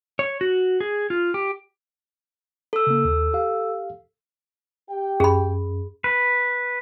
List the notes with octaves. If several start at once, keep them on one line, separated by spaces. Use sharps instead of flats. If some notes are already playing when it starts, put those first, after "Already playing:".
C#5
F#4
G#4
F4
G4
A4 E6
C#3 A#3
D#2
G4 F5
G4 G5
F#2 G#4 B5
B4